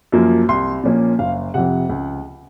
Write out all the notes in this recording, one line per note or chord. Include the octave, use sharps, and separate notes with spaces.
F#2 F3 A#3
C2 C6
A#2 F3 A#3 C#4
F#1 F5
F2 C3 F#5
C#2